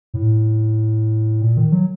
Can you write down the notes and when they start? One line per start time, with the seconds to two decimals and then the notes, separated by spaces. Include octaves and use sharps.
0.14 A2
1.41 A#2
1.57 D#3
1.72 F#3